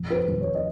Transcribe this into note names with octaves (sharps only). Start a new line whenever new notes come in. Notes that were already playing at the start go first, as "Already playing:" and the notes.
Already playing: F1
B4
C5
D#2
C#5
D#5